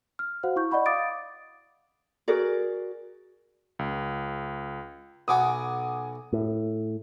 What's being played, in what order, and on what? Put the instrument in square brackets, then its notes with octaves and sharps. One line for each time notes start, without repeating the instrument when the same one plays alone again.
[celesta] F6
F#4 C5 F5 F#5
E4 C#6 G6
D5 D#5 F#5 B5 C#6
F5 D6 D#6 A6 D7
[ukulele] F#4 G#4 A#4 D5
[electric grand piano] C#2
[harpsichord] B1 B3 F#4 [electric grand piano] G#5 D6 D#6
[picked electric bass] A2